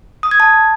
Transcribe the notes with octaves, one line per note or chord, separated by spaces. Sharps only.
D#6
G#6
A5